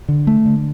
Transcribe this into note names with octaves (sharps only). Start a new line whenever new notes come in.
D3
A3
D3